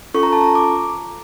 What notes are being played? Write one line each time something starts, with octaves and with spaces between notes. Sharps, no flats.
C#4 F4 A4 C#6
A#5
A5
A#5
D6